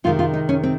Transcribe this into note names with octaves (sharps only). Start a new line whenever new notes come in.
C3 D#3 G#3 F4
F4
D#4
C#4
C4